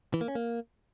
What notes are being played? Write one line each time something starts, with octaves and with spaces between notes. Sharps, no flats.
E3
A#3
C#4
A#3